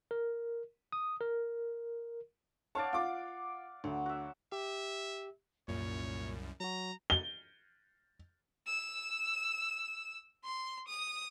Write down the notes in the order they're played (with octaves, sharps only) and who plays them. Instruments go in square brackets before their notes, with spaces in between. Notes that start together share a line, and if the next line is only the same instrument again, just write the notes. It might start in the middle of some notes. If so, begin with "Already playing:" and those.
[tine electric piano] A#4
D#6
A#4
[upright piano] C#5 A5 [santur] D5 F5 F#5
[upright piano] F4 D6
[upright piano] D2 [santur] F#3
[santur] F#4 E5
[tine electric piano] G4 [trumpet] E5
[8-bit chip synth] C2 F#2 [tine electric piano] A#2 [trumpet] C#5
[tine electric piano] F#3 F#4 [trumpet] A#5
[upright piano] G7
[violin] E6
C6
D#6